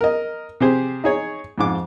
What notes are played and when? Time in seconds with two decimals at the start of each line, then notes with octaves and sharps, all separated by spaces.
0.01 A#4 D#5
0.60 C3 G4 G#4 C5
1.04 D#4 G#4 C#5
1.58 F2 G#2 D6